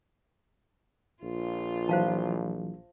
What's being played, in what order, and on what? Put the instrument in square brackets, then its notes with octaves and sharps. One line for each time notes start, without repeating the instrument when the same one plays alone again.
[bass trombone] A#1 [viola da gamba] F4
[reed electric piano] E3 F#3 [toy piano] C5 F5 A5